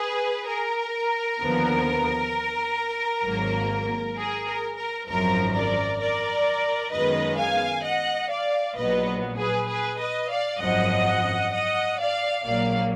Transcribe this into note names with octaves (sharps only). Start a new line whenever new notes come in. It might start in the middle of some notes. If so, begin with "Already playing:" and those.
Already playing: G#4 B4
A#4
D#2 D3 F3 B3
G#1 G#2 F#3 A#3
G#4
A#4
A#4
G#1 F#2 F3 A#4
A#4 D5
A#4 D5
F#2 D#3 G#3 B3 B4 D#5
F5 G#5
D#5 F#5
D5 F5
A#1 A#2 F#3 B3 B4 D#5
G#4 B4
G#4 B4
B4 D#5
D5 F5
G#1 F#2 F3 D#5 F#5
D#5 F#5
D5 F5
A#1 A#2 F#3 A#3 D5 F5